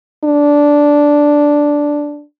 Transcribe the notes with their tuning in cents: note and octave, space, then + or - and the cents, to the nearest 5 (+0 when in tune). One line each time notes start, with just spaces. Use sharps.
D4 -5